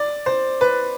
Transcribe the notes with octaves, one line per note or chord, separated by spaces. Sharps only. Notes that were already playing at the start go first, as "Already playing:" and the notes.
Already playing: D5
C5
B4